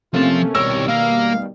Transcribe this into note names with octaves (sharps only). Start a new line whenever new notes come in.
C3 F3 A3 A#3 C#4 F4 A5
C2 B2 D#3 G3 A#4 C#5 E6
A#3 A#4 F5